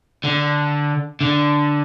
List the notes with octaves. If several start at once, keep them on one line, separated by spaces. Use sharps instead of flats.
D3
D3